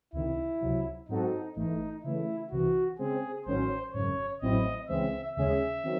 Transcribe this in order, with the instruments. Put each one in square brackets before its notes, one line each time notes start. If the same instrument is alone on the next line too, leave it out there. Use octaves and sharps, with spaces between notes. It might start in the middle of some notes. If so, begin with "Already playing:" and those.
[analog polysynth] C#2 C3 D#3 [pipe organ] E4
[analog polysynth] C#2 C3 F#3
[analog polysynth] G#2 F#3 C4 F#4 A4 [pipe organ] D#4
[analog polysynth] G#1 G#2 E3 A3 [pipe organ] D#4
[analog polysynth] C#3 E3 A3 [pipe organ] E4
[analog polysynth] C2 C3 E3 [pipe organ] F#4
[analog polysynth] C#3 G#3 C4 [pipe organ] G#4
[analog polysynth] A1 G#2 D#3 F#3 C#4 [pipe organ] C5
[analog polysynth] G#1 F#2 C#3 [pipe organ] C#5
[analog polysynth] A1 A2 F#3 C4 E4 [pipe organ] D#5
[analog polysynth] C#2 C#3 E3 G#3 C4 [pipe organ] E5
[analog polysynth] D#2 C#3 G#3 C#4 G#4 [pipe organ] E5
[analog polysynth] D#3 F#3 C4